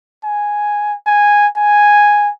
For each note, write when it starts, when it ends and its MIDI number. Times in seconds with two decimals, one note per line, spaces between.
0.24 0.95 80
1.07 1.48 80
1.57 2.31 80